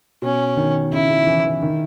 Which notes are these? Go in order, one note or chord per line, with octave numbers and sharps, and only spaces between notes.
B2 C#4
D#3
C#3 E4
C#3
E3
E3
D#3